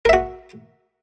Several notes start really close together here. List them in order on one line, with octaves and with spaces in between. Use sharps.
A#4 E5 F#4